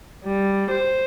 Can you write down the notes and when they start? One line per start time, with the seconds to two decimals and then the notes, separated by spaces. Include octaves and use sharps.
0.24 G3
0.70 C5